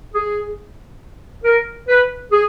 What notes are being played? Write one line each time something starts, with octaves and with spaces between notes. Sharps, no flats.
G#4
A#4
B4
G#4